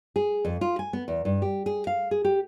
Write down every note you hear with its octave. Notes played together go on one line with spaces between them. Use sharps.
G#4
F2
F4
G#5
B3
E2
G2
G4
G#4
F5
G#4
G4